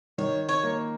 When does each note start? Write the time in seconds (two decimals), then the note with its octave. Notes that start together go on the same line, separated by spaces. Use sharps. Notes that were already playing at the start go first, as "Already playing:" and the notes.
0.18 D#3 C#5
0.49 C#5
0.63 A#3